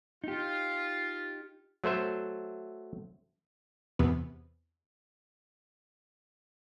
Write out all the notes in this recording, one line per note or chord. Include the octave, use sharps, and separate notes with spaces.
D#4 F4 G4
F#3 A3 C5 E5
E2 C3 B3